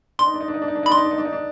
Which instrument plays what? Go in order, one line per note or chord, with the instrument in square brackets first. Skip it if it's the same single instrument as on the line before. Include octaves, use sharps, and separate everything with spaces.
[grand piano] D4 [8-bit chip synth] C6
[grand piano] D#4
D4
D#4
D4
D#4
D4
D#4
D4
D#4
[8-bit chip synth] B5
[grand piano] D4 [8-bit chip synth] C6
[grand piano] D#4
D4
D#4
D4
D#4
D4